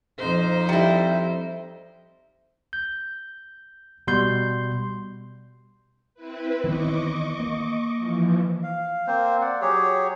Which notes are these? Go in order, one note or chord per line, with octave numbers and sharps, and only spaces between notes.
F2 D#4 C5
G3 E4
G6
B2 G3 C6 G6
C4 E4 B4
D#3 E3 B3 D#5 C#6 D6
A#3
E3 F3
F5
A#3 C4 C5
D5 F#5
F#3 G4 G#4 C#5